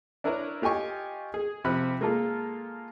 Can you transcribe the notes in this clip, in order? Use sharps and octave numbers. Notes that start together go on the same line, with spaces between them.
D4 E4 A#4 B4 C#5 A#5
F4 G4 D#5 G#5 C#6
G#4
C3 F3 B5 F#6
G#3 A#3 F4 A4 A#4